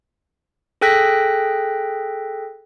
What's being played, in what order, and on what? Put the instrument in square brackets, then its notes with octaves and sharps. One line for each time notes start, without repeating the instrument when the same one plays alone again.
[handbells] G#4 A4 G5 F#6 A#6 B6